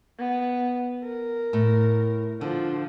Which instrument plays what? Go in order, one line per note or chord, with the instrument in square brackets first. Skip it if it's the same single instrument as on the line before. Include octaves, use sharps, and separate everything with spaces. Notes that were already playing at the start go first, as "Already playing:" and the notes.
[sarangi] B3
A#4
[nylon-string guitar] A2
[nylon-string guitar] D3 [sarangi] F3